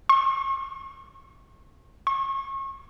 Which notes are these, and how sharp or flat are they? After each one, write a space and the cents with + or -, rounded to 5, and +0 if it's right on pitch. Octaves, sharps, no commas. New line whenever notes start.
C#6 -45
C#6 -35